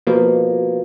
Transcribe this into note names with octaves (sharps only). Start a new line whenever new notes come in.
B2 F3 A#3